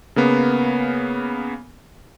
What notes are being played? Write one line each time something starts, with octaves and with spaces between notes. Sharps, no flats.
C#3 A#3 B3